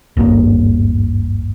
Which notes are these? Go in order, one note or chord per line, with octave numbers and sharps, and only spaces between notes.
D#1 G#1 G2 A#3